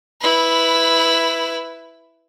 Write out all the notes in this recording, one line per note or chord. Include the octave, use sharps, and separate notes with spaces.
E4 B4